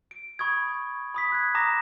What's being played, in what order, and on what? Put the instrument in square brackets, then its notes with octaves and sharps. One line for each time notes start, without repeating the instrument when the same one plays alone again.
[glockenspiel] D7
B5 C#6 D#6 G#6
B5 D#6 B6
F#6 G#6
A#5 D6 D#6 A#6 E7